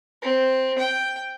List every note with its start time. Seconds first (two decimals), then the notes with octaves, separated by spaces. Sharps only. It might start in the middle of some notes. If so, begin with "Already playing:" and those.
0.22 C4
0.78 G5